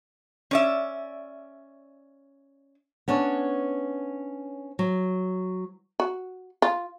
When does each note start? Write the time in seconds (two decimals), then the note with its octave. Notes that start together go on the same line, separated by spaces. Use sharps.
0.51 C#4 D5 E5
3.08 B3 C#4 D4 C#5
4.79 F#3
6.00 F#4
6.62 F4